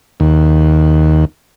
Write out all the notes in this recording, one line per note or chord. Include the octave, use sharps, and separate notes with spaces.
D#2